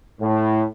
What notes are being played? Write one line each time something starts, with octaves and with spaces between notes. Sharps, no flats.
A2